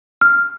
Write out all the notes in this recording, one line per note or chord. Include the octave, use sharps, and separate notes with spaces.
F6